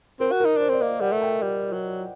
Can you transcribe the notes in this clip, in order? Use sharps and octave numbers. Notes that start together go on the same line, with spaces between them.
C4 A#4
F#4
D#4 A#4
D4 C5
C4 D5
A#3 D#5
G3 F#5
A3
G5
G3
F#3